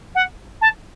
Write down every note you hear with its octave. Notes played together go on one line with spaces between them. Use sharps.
F#5
A5